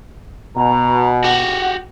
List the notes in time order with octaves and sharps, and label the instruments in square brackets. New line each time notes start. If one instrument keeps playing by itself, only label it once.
[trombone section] B2 [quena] A#5
[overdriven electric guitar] F#4 G4 [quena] F#5